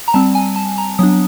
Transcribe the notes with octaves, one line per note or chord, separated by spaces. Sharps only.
A#5
G3 C4 A5
G#5
A5
A#5
F#3 B3 D4 D#6